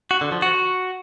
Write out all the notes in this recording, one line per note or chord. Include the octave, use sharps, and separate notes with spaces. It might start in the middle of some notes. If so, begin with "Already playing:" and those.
F#4
D3
F3
F#4